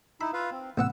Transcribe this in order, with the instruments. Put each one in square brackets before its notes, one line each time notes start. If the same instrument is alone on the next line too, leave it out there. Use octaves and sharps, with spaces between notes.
[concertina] D#4 E4 [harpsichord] B5 [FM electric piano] E6
[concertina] F4 B4 F5
C4
[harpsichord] A1 B3 F#5 [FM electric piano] A2 C3 [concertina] E6